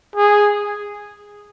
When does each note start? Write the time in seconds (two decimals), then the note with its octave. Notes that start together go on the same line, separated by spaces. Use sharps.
0.16 G#4